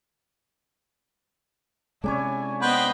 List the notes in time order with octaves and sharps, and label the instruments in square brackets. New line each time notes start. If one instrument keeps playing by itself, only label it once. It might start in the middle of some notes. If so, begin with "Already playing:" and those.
[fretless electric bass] C3 G#3 C#4 [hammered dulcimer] D4 E4 C#5 [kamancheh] G#5
[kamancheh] B3 D#5 [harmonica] B4 C5 G5